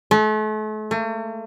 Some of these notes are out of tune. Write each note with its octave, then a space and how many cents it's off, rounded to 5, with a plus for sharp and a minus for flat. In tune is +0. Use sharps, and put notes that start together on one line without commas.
A3 -40
A3 +45